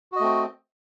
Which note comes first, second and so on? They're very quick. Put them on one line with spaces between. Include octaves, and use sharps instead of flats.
F#4 D#5 A3 C4